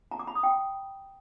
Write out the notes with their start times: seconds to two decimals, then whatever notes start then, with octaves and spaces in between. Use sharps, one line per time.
0.11 A#5
0.19 D6
0.27 B5
0.35 D#6
0.43 G5